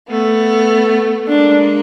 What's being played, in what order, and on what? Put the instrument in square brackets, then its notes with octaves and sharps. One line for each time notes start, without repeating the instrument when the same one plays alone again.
[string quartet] A3 B3
[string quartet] G#3 A#3 [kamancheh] D4